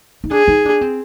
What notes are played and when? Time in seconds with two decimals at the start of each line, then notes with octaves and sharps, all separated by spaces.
0.24 D#4
0.31 D4 G#4
0.48 D#4
0.65 D4
0.81 C4